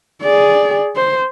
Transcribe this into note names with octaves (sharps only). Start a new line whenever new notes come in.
G#4 D5
C5